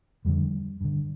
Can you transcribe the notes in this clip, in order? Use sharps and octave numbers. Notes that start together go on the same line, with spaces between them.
F2 D3 G3
G2 D3